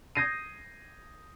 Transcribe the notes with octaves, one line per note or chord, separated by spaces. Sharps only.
D#6 G6 G#6 A#6 C7 D#7